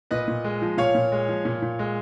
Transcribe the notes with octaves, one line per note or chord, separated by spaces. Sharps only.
A#2 B4 D#5
A#2
G#3
F3
A#2 C#5 F5
A#2
G#3
F3
A#2
A#2
G#3